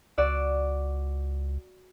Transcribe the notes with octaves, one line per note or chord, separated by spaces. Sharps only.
C#2 F#4 D5 E6